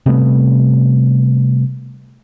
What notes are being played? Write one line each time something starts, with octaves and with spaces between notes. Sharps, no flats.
C3 G3 A3 B3